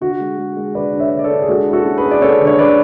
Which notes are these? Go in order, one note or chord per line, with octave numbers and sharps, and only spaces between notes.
D3 F#4
G#3
G#3
G#3
D3 B4 D5
D4
C#5 E5
D3
D5
A4 C#5
D4
G#4
G#3 F#4 A4
E4
F#4 A4
C#4
G#4 B4
C#4
D5
C#4 A4 C#5
D3
C#5
D3 B4 D5